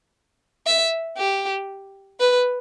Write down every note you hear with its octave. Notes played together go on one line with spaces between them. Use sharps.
E5
G4
B4